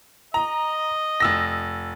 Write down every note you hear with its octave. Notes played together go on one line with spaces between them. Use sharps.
D#5 A#5
F1 E6 A#6